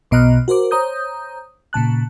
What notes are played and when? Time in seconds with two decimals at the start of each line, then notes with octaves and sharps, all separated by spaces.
0.11 B1 B2 D#5 A#5 F6 F#6
0.48 F#4 A#4 C5 D6
0.71 C5 C#5 A#5 D#6 G6
1.73 A#2 C#3 A5 F#6